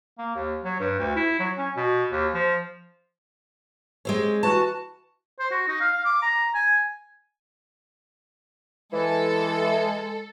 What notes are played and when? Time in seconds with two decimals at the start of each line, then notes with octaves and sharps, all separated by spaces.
0.18 A#3
0.35 D#2
0.64 F#3
0.80 G2
0.99 D2
1.16 E4
1.40 F#3
1.58 C#4
1.76 B2
2.12 D#2
2.34 F3
4.05 G#3 C4 C#4
4.43 E3 F#4 A5
5.39 C5
5.51 F#4
5.68 D#4
5.81 F5
5.93 F5
6.05 D6
6.22 A#5
6.55 G#5
8.92 E3 G#3 A4